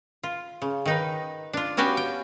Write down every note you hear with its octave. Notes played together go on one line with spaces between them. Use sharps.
F4
C#3
D#3 D#4 B4
D4 F4
B3 C#4 F#4 G4 B4 F5
G5